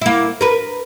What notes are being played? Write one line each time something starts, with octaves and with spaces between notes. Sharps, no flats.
A#3 E4
A#4 B4